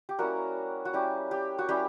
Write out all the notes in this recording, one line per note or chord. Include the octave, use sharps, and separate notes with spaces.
G4
G3 A#3 C#4 E4 F#4 A#4
F#4
G3 C#4 E4 G4
G4
F#4
G3 C#4 E4 G4